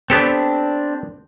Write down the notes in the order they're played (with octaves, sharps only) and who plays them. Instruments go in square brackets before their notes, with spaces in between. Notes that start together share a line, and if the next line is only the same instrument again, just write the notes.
[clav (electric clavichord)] B3 G4 A4 [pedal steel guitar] C4 D4